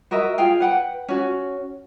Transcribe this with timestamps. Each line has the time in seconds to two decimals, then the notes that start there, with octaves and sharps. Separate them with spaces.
0.11 F#4 A#4 D#5 E5
0.38 F4 G#4 F5 G5
0.60 B4 F#5 G5
1.08 C#4 F#4